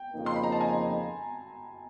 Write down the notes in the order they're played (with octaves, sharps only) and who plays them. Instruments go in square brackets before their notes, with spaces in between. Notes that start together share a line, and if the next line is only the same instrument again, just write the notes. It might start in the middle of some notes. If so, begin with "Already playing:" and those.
Already playing: [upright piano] G5
[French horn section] F2 C#3 F3 A#3 D#4
[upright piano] C6
B5
A#5
A5
G#5